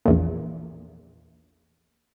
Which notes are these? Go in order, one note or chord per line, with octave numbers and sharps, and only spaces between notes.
A#1 E2 A#2